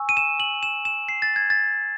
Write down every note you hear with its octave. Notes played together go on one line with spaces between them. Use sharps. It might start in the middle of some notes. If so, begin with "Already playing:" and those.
Already playing: G#5 C#6 E6
D#7
E7
F#7
E7
E7
C7
A6
G#6
A6